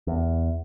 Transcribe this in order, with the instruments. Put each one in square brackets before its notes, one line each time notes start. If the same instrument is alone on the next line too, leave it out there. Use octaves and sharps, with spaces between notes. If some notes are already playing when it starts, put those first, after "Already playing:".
[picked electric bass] E2